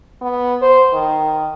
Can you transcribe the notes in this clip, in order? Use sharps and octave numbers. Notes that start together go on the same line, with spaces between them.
B3
C5
D#3